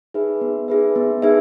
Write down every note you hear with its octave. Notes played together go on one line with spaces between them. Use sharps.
D#4 G#4 B4 E5
B3
D#4 G#4 B4 E5
B3
D#4 G#4 B4 E5